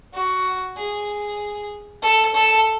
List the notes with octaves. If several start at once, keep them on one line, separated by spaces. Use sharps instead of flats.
F#4
G#4
A4
A4